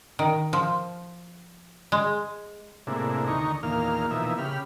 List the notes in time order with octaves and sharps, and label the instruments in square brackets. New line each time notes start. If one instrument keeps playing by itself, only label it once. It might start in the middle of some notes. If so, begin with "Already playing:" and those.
[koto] D#3
F3
G#3
[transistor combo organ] A2 C3 G#3 A#3 D4 E4
D2 D#3 D#4 A#5 C#6
E2 A#2 D#3 A#3 F5 F6
B2 E3 F3 A#3 D#4 E5
C#3 G4 B5 F6